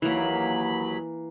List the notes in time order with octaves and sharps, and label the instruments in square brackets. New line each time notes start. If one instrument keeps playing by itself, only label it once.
[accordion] D#2 F#3 B5 [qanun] E3 A#3